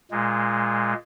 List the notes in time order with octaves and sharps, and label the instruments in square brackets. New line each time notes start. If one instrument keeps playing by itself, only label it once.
[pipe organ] A#2 G#3